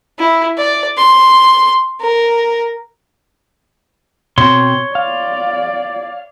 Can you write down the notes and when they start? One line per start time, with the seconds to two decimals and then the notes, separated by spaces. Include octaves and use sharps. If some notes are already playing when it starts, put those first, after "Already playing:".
0.19 E4
0.58 D5
0.97 C6
2.01 A#4
4.38 B2 C4 C#5 C6
4.95 D5 F5